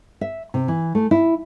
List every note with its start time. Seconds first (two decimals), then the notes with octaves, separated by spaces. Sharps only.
0.21 E5
0.54 C3
0.68 E3
0.95 A3
1.11 E4